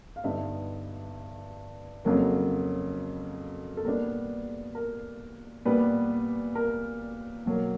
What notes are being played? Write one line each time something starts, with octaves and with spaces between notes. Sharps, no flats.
F5
G2 D3 G3 B3 D#4 E5
F2 C#3 F#3 A#3
A4
A#2 G3 B3 D4 A#4
A#4
A#2 G3 B3 D4 B4
A#4
B2 F#3 A#3